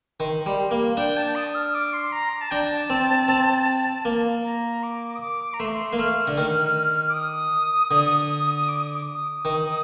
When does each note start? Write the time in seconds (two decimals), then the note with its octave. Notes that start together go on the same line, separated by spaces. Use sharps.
0.20 D#3 C6
0.46 G3
0.71 A#3
0.97 D4 G5
1.17 A5
1.35 D#6
1.55 F6
1.74 D6
1.93 C6
2.12 A#5
2.33 A#5
2.41 A5
2.51 D4 G5
2.60 A5
2.90 C4
3.28 C4
4.05 A#3
4.44 A#5
4.83 D6
5.16 D#6
5.21 D6
5.54 A#5
5.60 A3 C6
5.93 A#3
5.99 A3 F6
6.27 D3
6.38 D#3
7.09 D6
7.14 D#6
7.91 D3
8.68 D6
8.81 D#6
8.93 D6
9.07 D#6
9.45 D#3